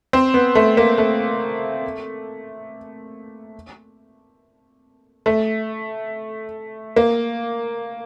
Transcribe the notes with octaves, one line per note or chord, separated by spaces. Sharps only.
C4
B3
A3
A#3
A3
A3
A#3